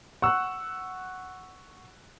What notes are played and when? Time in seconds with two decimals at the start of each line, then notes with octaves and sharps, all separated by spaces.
0.22 F#5 C#6 E6 F#6